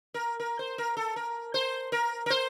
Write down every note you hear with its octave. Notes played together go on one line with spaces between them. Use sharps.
A#4
A#4
C5
A#4
A4
A#4
C5
A#4
A#4
C5